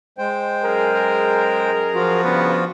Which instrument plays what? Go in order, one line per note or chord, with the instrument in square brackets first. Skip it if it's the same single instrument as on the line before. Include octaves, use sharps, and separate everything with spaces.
[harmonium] G#3 C5 G5
[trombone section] F#2 G#4 A#4
[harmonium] F3 F4 F#4
[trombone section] G2 C#3 B3